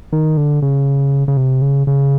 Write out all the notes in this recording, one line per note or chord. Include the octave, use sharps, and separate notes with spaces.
D#3
D3
C#3
C#3
C3
C#3
C#3